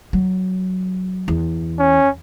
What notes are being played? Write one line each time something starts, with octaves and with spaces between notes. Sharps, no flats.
F#3
E2
C#4